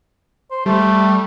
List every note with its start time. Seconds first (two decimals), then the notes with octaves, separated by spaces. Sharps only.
0.51 C5
0.66 G3 A3